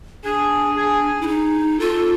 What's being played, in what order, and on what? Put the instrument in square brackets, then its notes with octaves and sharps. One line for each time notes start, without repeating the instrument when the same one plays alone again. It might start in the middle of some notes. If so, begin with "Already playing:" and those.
[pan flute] D4 [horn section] G#4
[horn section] G#4
[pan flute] E4
D#4
[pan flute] F4 [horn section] A4